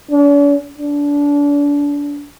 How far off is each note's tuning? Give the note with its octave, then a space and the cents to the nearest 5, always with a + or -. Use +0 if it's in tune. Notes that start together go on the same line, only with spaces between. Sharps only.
D4 -45
D4 -30